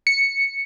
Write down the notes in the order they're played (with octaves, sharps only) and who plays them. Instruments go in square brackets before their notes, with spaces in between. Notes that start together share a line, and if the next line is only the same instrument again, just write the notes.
[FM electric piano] C#7